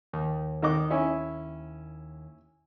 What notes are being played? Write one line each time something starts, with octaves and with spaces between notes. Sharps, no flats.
D#2
D#3 D#5 D6
C#4 E4